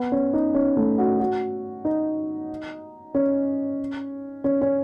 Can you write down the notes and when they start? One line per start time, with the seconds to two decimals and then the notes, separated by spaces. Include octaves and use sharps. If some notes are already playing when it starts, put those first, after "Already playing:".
Already playing: B3
0.12 C#4
0.33 D#4
0.54 C#4
0.77 A3
0.98 F#4
1.19 F#4
1.85 D#4
3.15 C#4
4.44 C#4
4.61 C#4